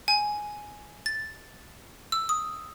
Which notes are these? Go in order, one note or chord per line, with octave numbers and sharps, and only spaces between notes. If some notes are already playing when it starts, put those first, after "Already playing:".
G#5
A6
E6
D#6